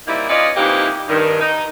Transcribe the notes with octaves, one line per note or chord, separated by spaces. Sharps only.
G3 A#3 C4 D#4 E4
C#4 F4 B4 D5 D#5
C3 E3 F3 A#3 D#4 G4
G2 D#3
D#4